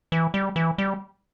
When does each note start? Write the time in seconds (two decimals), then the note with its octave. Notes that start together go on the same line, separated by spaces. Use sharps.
0.12 E3
0.34 G3
0.56 E3
0.78 G3